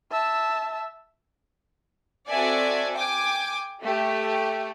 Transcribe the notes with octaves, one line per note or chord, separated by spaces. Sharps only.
E5 A5
C4 F#4 A4 D5 E5 G#5
G5 G#5 D6
A3 G4